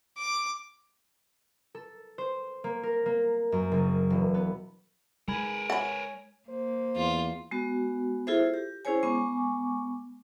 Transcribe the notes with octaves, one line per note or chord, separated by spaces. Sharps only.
D6
A4
C5
A#3
A#4
A#3
F#2
F#1
E1
B3
G#3 A#4 B4 G#5 B5 G#6
C#5 F#5 G#5 B5
A#3 C5
E2 F4
G#3 B3 F#4
E4 F4 G#4 A4 C5 E5
G4
C#4 E4 G#4 C5 C#5 G#5
G#3 B3 G#5 C#6 D6